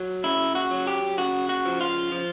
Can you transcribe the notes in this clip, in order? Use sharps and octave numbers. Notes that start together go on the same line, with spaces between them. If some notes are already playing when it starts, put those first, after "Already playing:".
Already playing: F#3
C#3 E4
F#4
F#3
G4
C#3 F#4
F#4
F3
F4
F3